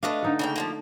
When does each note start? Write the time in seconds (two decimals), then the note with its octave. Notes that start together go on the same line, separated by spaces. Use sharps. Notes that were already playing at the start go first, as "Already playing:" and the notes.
0.03 A3 D4 B4 D#5 F5
0.23 D3 D#4 A4
0.39 C#3 A#3 G5
0.56 F3 G#3 A#3